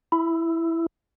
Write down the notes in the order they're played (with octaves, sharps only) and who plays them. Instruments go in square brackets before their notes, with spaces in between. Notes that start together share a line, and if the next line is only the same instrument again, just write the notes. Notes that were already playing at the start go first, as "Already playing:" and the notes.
[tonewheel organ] E4